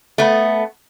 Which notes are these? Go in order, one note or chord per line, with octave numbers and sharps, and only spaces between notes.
A3 B3